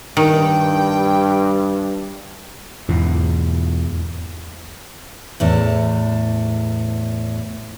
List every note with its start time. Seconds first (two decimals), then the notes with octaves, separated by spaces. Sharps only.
0.17 G2 D#3 G5
2.88 E2 G#2 B2
5.40 E2 A2 A5